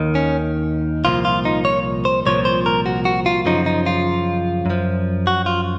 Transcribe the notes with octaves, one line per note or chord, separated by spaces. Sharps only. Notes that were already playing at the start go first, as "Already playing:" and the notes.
Already playing: D#2 D#3
C#4
C2 A#2 F3 F4
F4
D#4
C#5
C5
C2 A#2 F3 C#5
C5
A#4
F#4
F#4
F4
F#2 C#3 F3 D#4
D#4
F4
F#2 F3
F#4
F4